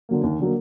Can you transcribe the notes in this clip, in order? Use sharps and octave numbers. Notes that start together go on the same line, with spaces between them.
D3 F#3 A#3
D#2
D3 F#3 A#3